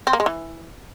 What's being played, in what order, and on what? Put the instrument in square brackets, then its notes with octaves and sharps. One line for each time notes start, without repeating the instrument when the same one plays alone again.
[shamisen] C4
A#3
G#3
E3